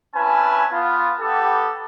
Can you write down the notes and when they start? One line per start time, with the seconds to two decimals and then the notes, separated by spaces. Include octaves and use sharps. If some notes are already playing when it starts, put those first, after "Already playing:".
0.15 C4 C#4 E4 B4 G#5 A5
0.72 B3 F4
1.20 B3 G4 A4